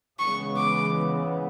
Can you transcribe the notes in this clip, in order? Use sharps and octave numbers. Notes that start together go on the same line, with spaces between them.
C#3 E3 G#3 B3 C#6
D6